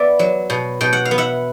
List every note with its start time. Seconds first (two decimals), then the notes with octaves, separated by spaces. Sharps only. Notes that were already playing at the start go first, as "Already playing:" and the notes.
Already playing: B3 D5 E5
0.19 F#3
0.50 B2
0.81 B2 G5
0.93 F#5
1.05 F5
1.11 B3
1.18 E5 F#5